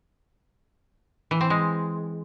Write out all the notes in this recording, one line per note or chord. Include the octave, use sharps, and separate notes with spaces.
E3
C4
G#3